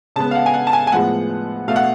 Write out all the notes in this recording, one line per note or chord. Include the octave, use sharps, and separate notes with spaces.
C#3 G#3 B3 A5
F5
F#5
G#5
F#5
A5
G#5
G#5
A2 F3 G#3 B3 F#5
B2 A3 F5
F#5